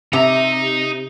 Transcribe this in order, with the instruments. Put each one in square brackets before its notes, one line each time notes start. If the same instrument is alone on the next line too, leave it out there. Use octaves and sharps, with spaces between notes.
[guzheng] C3 [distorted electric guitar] D#4 A#5